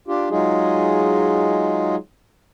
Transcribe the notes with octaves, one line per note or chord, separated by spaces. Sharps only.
D4 F4 G4
F#3 G#3 D#4 F4 G#4